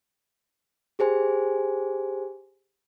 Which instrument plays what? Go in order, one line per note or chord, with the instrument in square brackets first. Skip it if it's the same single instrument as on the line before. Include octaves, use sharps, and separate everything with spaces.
[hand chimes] G4 G#4 C5 G#5